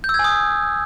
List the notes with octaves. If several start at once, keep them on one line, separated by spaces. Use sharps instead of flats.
G6
E6
G#6
G#5
D#6